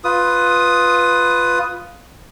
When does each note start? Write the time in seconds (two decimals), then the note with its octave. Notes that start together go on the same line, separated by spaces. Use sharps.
0.04 F4 B4 D#6